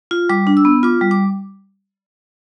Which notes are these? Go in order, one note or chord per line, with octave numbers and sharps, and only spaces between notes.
F4
G3 D6
D4
E6
B3
F4 D6
G3
D6